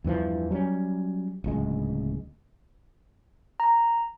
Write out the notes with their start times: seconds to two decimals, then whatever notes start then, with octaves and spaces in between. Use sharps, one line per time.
0.04 E2 G2 E3 F3
0.51 F#3 G3 C4 C#4
1.44 D1 C#2 G#3
3.60 A#5